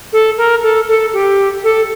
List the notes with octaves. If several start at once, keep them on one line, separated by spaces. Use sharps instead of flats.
A4
A#4
A4
A4
G4
A4